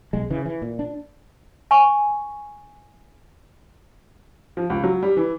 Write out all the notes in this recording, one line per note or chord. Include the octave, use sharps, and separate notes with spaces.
B1 G#3
C#3 E3
E3
A#2
D4
G#5 C#6
F3
C#2
F#3
G3
E3